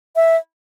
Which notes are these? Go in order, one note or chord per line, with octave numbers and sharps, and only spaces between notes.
E5